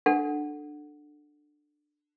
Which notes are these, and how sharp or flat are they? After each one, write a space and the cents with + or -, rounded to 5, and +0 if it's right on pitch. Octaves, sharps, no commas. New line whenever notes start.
D4 +15 A4 +0 F#5 +0